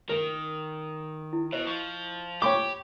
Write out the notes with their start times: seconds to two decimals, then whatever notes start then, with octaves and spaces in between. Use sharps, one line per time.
0.09 D#3 A#4
1.33 E4
1.52 B2 C5 D#5
1.67 F3 C#6
2.42 G4 C#5 G5 B5 C#6 D6